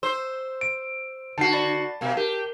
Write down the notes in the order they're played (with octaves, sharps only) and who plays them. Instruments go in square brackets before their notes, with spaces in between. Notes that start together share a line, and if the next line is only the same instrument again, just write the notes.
[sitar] C5 [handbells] E6
[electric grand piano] D7
[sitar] D3 F#4 [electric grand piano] A5 C7
[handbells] D5 B5 A6
[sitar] B2 A#3
[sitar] G4 [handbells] A#4